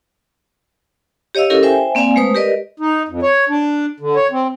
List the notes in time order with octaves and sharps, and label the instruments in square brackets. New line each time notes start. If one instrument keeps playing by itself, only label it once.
[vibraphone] G4 C#5 D#5 F5 E6
C#4 E4 G4 A4 A#4
C5 E5 G5 G#5
A#3 C4 D5 F5 G#5
G#3 A3 B4 C5 D#6
G4 A#4 B4 D5 D#5
[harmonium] D#4
F2
C#5
D4
D3
C#5
C4